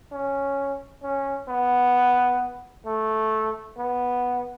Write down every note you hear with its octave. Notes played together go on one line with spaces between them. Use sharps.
C#4
C#4
B3
A3
B3